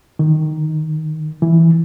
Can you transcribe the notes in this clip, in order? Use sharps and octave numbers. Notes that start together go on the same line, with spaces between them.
D#3
E3